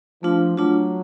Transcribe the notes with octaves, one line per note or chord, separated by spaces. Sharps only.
F3 A3 D4 F4
F#3 A3 D4 F4